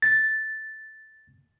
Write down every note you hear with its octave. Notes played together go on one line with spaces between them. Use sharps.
A6